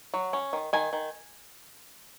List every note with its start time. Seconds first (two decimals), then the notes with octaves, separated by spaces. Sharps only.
0.14 F#3
0.33 C#4
0.53 D#3
0.73 D#3 G#5
0.93 D#3